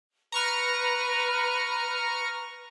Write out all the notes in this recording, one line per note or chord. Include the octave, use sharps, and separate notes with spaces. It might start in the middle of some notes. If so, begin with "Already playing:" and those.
B4 A#5 C#6 F6